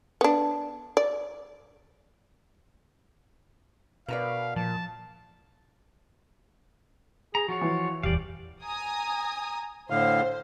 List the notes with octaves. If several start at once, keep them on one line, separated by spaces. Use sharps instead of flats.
B3 D4
D5
B2 A#4 B4 D5 F5
A#2 F3 A5
G#4 A#5
F3 F4 F#4 C#5
E3
D#1 E2 G4 D5 F5
G#5 A#5 D#6
A2 D3 C5 F5